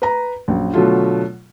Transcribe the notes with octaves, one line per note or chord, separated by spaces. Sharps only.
B4 A#5
A#1 F#2
B2 D3 F#3 A3 F4